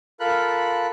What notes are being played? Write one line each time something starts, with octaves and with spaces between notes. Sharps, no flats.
F4 A4 A#4 B5 F#6